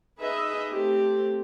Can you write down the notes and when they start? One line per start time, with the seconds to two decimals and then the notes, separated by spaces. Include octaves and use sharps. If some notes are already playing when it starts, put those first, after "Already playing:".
0.21 D#4 G#4 B4 D#5 E5
0.70 A3 C4 G4